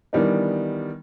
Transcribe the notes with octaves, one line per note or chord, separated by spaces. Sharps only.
D#3 E3 G3 B3 D4 D#4